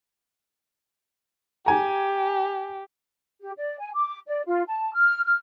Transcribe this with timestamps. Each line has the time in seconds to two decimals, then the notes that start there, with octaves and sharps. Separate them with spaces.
1.66 G4 G#5 A#5
3.41 G4
3.57 D5
3.80 G#5
3.94 D6
4.28 D5
4.46 F4
4.68 A5
4.94 F6
5.25 F6